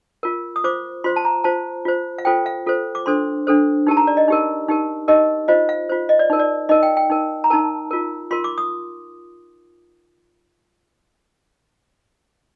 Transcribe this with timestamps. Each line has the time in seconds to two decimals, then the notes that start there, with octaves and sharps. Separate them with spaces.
0.23 F4 A#4
0.56 D#6
0.64 F4 C5 D6
1.04 F4 C5 C6
1.16 A5
1.25 A#5
1.44 F4 C5 A5
1.85 F4 C5
2.18 F5
2.25 F4 A4 C5 G5
2.46 F5
2.67 F4 A4 C5
2.95 D6
3.06 D4 A4 C5 C6
3.47 D4 A4 C5
3.87 D#4 G4 A#4 A5
3.97 A#5
4.07 D5
4.17 D#5
4.28 D#4 G4 A#4
4.68 D#4 G4 A#4
5.08 D#4 G4 A#4 D#5
5.48 F4 C5 D#5
5.69 F5
5.89 F4 C5
6.09 D#5
6.19 D5
6.30 D#4 A#4
6.39 D5
6.69 D#4 A#4 D#5
6.83 G5
6.97 G5
7.10 D#4 A#4
7.44 A#5
7.50 D#4 A#4 A5
7.91 F4 A#4
8.31 F4 A#4 C6
8.44 D6
8.58 D#6